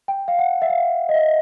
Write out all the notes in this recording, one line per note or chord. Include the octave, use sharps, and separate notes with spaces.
G5
F5
F#5
E5
F5
D#5
E5